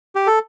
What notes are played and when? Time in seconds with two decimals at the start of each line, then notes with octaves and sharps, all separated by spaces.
0.15 G4
0.27 A4